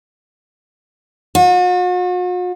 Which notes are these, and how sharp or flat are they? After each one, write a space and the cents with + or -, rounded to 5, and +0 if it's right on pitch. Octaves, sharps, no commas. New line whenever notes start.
F#4 -45